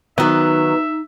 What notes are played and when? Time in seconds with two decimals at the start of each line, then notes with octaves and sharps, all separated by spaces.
0.18 D#3 F#3 B3 D#4 E5